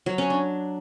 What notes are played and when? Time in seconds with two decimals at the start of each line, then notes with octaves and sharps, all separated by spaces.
0.06 F#3
0.18 C#4
0.30 D4